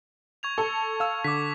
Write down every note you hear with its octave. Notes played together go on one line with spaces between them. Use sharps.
C#6 G#6 F7
A4 C#6
F5 E6
D3 D6 B6